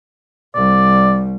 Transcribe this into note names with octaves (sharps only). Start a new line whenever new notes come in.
C2 G3 D5